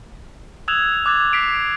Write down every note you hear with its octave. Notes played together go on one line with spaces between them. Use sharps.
D#6 E6 F#6 G#6 E7 F7
D6 F#6 G#6 A6
B6 C7 D7 F7